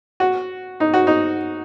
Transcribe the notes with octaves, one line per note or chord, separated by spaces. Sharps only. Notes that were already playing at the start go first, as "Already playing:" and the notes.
F#4
D#4
F#4
D#4